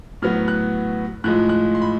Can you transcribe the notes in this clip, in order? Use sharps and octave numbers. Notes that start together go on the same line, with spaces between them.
A2 F#3 B3 F6
F#6
A2 F3 G#3 F#6
F#6
C6
B5